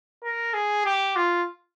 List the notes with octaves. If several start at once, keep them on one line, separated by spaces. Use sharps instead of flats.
A#4
G#4
G4
F4